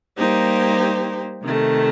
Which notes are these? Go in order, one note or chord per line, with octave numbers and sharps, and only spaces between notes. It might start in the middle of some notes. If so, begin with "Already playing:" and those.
G3 A#3 D#4 G4 C5
C3 D#3 A3